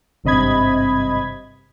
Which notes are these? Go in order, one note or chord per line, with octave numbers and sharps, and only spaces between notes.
G#1 G2 C3 D#5 B5 G#6